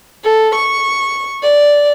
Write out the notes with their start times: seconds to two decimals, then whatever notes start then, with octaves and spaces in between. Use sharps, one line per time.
0.24 A4
0.55 C#6
1.42 D5